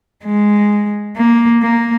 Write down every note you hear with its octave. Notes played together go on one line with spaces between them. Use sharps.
G#3
A#3
A#3